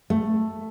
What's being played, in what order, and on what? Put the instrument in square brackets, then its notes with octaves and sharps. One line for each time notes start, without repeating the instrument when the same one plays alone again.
[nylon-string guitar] A3